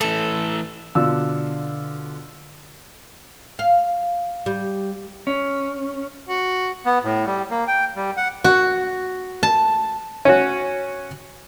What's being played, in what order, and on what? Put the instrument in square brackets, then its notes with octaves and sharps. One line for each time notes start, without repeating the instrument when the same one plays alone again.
[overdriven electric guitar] E3 A3 [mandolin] A4
[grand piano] B2 D3 F4 E6
[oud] F5
G3
[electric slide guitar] C#4
[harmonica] F#4
[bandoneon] B3
A2
G3
A#3
G5
G3
F#5
[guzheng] F#4
A5
[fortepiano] C#4 F#4